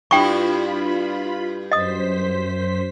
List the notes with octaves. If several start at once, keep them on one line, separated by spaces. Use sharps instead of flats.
G2 E4 F4 G5 B5 C#6
F#2 C5 D#5 D#6 B6